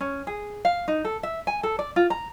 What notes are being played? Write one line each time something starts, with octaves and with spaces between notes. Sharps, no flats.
C#4
G#4
F5
D#4
A4
E5
G#5
A4
D5
F4
A#5